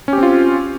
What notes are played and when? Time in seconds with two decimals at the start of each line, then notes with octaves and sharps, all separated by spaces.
0.08 C#4
0.13 G4
0.18 C4
0.23 F4